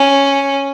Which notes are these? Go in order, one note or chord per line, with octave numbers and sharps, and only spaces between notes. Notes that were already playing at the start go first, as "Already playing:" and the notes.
Already playing: C#4